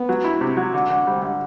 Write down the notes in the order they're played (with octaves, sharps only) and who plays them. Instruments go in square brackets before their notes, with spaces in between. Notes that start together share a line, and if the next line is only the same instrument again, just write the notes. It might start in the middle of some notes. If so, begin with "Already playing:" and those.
Already playing: [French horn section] B3
[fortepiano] F#3
E4
C3
F#3
D3
D3
[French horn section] C3 [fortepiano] G3
[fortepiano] D3